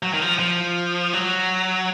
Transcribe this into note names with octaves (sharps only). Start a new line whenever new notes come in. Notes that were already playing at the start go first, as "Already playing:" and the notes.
F#3
D#3
F3
F3
F#3